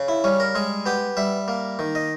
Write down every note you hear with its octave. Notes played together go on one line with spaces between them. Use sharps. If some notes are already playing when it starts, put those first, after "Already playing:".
Already playing: C#3
E4
G3 C#4
A#4
G#3 G#4
B3 G4
G3 E5
A#3
D#3
D#5